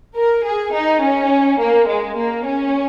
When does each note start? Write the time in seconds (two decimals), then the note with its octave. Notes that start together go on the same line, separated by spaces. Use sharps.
0.16 A#4
0.45 G#4
0.74 D#4
1.02 C#4
1.60 A#3
1.88 G#3
2.17 A#3
2.46 C#4